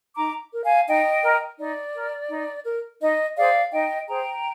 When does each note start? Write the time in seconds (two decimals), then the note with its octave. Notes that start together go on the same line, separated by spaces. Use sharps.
0.16 D#4 A#5 D6
0.52 A#4
0.63 F5 G#5
0.87 D#4 D#5 G5
1.23 A#4
1.58 D#4 D5
1.94 A#4
2.29 D#4
2.65 A#4
3.01 D#4 D#5
3.36 G#4 C5 D5 F5
3.72 D#4 D#5 G5
4.07 G#4 C5 G5 A#5